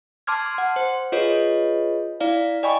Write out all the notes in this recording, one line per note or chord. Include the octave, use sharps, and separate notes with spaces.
A5 C6 D6 F6 G#6
F#5 C6
C5
F4 G#4 B4 C#5 D#5
E4 D5 F5
D5 D#5 G5 G#5 B5 C#6